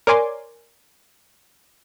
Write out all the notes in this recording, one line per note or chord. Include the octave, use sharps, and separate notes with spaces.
A#4 C#5 D5 G#5 C6 D6